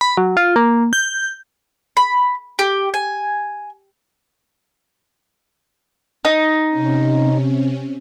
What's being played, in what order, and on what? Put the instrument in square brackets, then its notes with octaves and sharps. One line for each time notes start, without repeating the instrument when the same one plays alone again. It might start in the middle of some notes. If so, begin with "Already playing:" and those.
[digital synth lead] B5
F#3
F4
A#3
G6
[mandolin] B5
G4
G#5
D#4
[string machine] C3 C#4